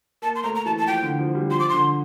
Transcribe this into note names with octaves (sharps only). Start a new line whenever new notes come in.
A#3 A5
C6
A3 A#5
A#5
E3 A5
A5
F3 G5
D3
F3
G3
F3 C6
D6
D3 C6